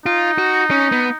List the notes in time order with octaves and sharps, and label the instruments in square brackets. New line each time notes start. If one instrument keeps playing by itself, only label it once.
[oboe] D#4 [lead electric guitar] F4
[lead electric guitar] F#4
C#4
B3